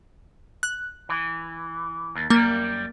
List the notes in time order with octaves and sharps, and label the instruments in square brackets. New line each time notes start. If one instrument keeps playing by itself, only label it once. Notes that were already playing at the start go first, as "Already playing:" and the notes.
[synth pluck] F#6
[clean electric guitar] E3
D#2
[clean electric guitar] F#2 G3 [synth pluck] A#3